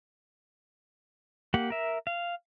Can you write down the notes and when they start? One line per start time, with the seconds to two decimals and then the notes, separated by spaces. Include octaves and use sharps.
1.54 A#3 G4 F#5
1.70 A#4 E5
2.07 F5